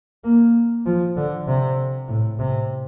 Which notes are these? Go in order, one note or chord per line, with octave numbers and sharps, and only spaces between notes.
A#3
F3
D3
C3
A2
C3